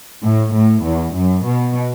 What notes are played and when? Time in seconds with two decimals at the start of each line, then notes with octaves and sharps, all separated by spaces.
0.22 A2
0.53 A2
0.83 E2
1.14 F#2
1.45 B2